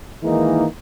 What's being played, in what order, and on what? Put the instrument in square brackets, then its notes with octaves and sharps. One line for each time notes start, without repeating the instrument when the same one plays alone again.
[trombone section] D#3 E3 G#3 A#3 D#4